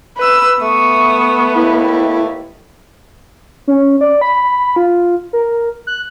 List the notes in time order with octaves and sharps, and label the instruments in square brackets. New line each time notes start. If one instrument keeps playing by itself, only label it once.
[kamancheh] B4 E6
[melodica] A3 [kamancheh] B3 [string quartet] E5 C#6 D#6
[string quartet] D#2 B4 [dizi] E4
[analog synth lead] C#4
D5
B5
F4
A#4
F#6